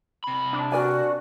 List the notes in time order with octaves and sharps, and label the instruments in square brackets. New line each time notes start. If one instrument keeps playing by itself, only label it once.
[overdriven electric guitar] C3 B5
[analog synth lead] D4
[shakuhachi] F#4 [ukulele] A#4 D5 G#5